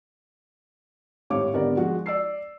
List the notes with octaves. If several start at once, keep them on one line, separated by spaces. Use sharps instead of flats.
G#1 A2 G4 C#5 F5 D6
G#1 D3 B3 G4 A#4 D5
F3 G#3 F#4
D5 E6 C7